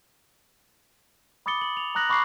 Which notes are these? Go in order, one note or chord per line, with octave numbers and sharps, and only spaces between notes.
B5 D6 D#6 A6 C#7 G7
F#7
F7
A#5 D#6 F#6 A#6 F#7
B5 C#6 D6 F#6 C7